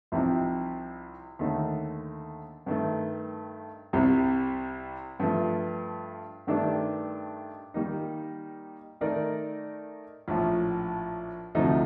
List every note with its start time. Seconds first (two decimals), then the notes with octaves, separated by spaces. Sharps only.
0.12 C2 C3 F3 C4 D#4
1.39 D#2 D3 A3 D#4
2.66 G2 D#3 A3
3.93 C2 C3 G3
5.20 G2 F3 A3
6.47 G2 D#3 A3 D4 G4
7.74 D#3 G3 A#3 D#4
9.01 D#3 A3 D#4 A#4 D5
10.28 A#1 A2 F3
11.55 D2 C3 F3 A3 D#4